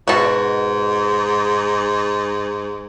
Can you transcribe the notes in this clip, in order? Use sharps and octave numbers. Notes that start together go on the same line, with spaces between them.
G#2 B2 F#4